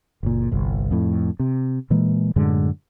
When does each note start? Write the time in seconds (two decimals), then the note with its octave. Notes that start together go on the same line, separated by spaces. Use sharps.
0.23 F#1 A#2
0.51 G1 C2
0.91 F2 A2
1.40 C3
1.90 A#2 E3 G#3 A#3
2.36 F#2 A2 D3 G#3